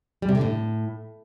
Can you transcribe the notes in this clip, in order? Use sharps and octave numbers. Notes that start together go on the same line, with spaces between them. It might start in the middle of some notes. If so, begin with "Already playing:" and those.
G3
C3
D3
A2